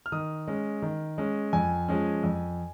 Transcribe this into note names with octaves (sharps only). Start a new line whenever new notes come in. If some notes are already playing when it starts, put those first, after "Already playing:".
F6
D#3 D#6
G#3 C#4
D#3
G#3 C#4
F2 G#5
F3 G#3 C#4
F2